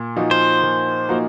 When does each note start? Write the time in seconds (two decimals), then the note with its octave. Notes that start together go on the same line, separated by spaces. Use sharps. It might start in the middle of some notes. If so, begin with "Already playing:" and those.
Already playing: A#2
0.16 F3 A#3 D#4 F#4
0.31 C5
0.63 A#2
1.09 F3 A#3 D#4 F#4